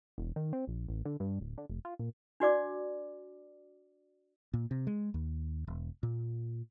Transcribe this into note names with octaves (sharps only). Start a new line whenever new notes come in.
E1
D#3
C4
A#1
A1
D3
G2
D1
D3
F1
F4
A#2
D4 F#4 D5 D6
A#2
C3
G#3
D#2
E1
A#2